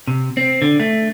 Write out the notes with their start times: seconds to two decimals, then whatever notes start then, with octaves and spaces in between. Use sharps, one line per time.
0.07 C3
0.37 C4
0.62 D3
0.80 A3